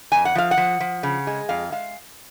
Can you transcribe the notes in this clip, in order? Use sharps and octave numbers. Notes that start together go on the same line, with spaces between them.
F2 G#5
F#5
F3 F5
F#5
F3
F3
C#3
G#3
F2 F5
G#3 F5